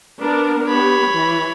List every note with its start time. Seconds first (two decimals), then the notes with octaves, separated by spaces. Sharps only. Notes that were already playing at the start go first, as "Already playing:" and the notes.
0.19 B3 D4 A#4
0.68 B3 G4 C#5 B5
1.12 E3